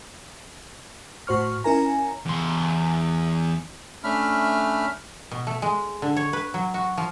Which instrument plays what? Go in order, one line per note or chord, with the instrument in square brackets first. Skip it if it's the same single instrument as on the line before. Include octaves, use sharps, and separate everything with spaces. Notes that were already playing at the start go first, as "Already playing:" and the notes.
[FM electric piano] A2 F#4 C5 C#6 F6
C#4 D#4 E4 A#4 G#5 A#5
[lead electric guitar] E2 C6
[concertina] A3 C#4 D4 E5 B5 F6
[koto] B2
A3
G#3
D3
C#5
B4
F#3
F#4
F3